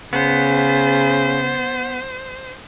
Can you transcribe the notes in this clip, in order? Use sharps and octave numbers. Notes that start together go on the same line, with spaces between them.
C#3 B3 C5